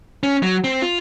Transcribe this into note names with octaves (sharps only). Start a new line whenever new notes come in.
C#4
F#3
C4
F4